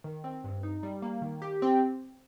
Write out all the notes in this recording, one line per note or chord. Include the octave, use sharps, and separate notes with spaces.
D#3
C4
G2
D#4
G3
A#3
D#3
G4
C4